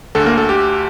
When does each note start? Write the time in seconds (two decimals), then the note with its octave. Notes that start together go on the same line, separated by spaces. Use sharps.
0.15 D2 D3 A4
0.26 A#3 A#4
0.38 A4
0.49 G4